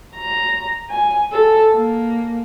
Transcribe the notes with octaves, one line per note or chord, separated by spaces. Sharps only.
A#5
G#5
A4
A#3